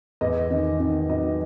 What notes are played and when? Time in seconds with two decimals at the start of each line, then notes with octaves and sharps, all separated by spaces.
0.21 E2 D#5
0.50 D#3
0.80 D#3
1.10 F#3 D#5